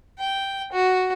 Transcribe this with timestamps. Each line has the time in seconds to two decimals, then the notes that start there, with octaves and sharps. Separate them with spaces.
0.19 G5
0.72 F#4